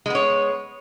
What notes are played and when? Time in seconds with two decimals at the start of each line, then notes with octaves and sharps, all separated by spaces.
0.06 G#3
0.10 B3
0.15 C#5